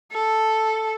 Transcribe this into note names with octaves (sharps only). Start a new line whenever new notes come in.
A4